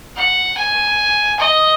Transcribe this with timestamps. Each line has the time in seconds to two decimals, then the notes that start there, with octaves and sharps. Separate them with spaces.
0.16 F#5
0.58 G#5
1.40 D#5